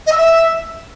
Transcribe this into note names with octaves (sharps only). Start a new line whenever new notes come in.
D#5
E6
E5